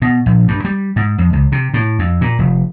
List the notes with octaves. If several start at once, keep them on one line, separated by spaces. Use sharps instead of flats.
B2
A#1
G2
G3
G#2
F2
C#2
C3
A2
F2
A#2
F1